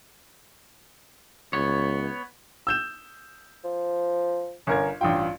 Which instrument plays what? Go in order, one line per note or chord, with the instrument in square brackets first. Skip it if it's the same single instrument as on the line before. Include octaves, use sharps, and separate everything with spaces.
[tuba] C#2 [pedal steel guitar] B3 C#5
[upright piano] E6 G6 E7
[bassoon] F3
[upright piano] G1 A#4 G#6 [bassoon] C#4
[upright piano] A1 G2 G5 [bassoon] F4